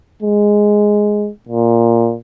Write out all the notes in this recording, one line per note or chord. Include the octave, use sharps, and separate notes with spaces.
G#3
A#2